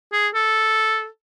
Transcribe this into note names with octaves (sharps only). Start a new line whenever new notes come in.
G#4
A4